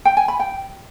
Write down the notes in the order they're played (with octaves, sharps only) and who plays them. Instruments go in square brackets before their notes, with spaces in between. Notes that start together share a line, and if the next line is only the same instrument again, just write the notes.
[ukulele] G5
G#5
B5
G5